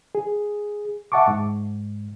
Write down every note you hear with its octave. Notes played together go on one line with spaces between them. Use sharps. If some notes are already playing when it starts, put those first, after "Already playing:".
G#4
E5 F#5 A5 C#6 D6
G#2